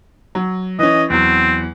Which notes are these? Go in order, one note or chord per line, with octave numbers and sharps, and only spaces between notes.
F#3
E3 C#4 D#5
E2 F#3 C4